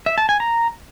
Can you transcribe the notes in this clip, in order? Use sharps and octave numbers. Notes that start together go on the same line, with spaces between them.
E5
A5
G#5
A#5